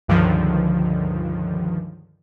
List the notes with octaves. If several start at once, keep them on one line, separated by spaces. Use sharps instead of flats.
C#2 G2 D3 D#3 F3